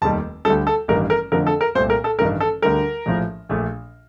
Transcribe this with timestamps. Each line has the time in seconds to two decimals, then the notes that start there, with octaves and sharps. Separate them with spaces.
0.02 F1 D#2 D#3 G3 A5
0.45 D2 D3 G3 A4
0.67 A4
0.88 A1 G2 D#3 G3 A#4
1.10 A#4
1.32 F2 D3 F3 A3 A#4
1.47 A4
1.61 A#4
1.75 C2 A#2 A3 C5
1.90 A#4
2.04 A4
2.19 A1 G2 D#3 A3 A#4
2.40 A4
2.62 D2 D3 G3 A#4
3.06 A#1 A2 F3
3.49 A#1 A#2 A3